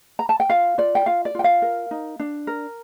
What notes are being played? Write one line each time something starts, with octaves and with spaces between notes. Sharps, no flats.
A#5
A5
G5
F4 F5
F4 D5
G5
F4 F5
D5
F4 G5
F5
A#4
D#4
D4
A#4